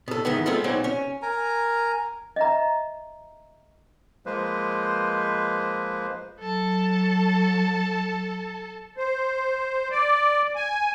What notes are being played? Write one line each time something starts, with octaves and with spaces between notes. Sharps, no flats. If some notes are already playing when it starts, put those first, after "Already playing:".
B2 A4
G#2 D#3 E3 B3
G#3 B3 C4 F4 A4
A#2 F#3 C4 D#4
C#4
A#4 G#5 A#5
D#5 E5 A#5
F3 G#3 A#3 B4 C5
F#3 A4 A5
C5
D5
G#5